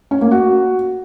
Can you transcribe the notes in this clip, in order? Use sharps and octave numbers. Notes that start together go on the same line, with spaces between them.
C#4
A#3
F#4